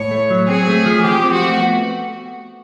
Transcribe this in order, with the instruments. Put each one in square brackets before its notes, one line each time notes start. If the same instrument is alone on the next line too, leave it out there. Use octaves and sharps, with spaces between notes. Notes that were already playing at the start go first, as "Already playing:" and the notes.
Already playing: [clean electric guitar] A2 [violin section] C#5
[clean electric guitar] A3
F#3
[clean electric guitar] C4 [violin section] G#4
[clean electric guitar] A3
F3
[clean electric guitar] F3 [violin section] G4
[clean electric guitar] C4
[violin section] F#4
[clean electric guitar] A3
B3